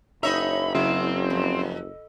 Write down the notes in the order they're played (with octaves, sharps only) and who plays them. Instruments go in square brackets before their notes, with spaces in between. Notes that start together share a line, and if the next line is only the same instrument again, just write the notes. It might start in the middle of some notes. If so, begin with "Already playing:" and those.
[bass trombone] F#1 [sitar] D#4 C#5 E5 [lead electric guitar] A#5 B5
[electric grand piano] C#3 F#3 E4 [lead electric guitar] C4
[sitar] F2